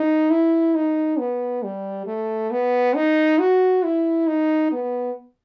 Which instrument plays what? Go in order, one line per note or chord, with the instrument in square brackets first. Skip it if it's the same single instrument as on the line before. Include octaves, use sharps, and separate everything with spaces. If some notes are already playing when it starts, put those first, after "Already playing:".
Already playing: [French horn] D#4
E4
D#4
B3
G3
A3
B3
D#4
F#4
E4
D#4
B3